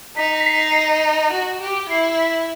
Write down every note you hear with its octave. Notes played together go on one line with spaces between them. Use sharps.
D#4 B6
B6
C7
F#4
G4
E4 C7
B6